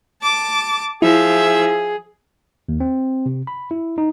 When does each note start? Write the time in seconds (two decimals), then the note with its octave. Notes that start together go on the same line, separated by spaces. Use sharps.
0.22 A5 D6
1.02 F3 E4 G#4 E5
2.69 D#2
2.80 C4
3.26 C3
3.47 B5
3.71 E4
3.98 D#4